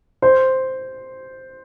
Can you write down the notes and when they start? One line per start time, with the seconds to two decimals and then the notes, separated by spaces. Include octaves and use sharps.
0.22 C5